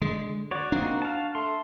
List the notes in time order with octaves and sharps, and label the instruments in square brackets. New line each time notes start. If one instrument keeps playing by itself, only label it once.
[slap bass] D3 [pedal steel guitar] G#3
[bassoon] F#4 [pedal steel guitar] C#5 D5
[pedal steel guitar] A#3 C4 D#4 [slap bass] D4
[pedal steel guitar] F5 A5
[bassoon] A3 [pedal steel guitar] C6